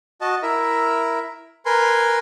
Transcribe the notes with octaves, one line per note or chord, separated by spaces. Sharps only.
F#4 D#5 A5
E4 A#4 E5
A#4 B4 G#5 C6